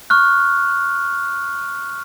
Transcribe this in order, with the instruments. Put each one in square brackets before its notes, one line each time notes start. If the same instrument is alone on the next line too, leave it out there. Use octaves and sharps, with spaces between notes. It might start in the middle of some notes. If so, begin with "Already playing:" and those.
[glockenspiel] C#6 F6 F#6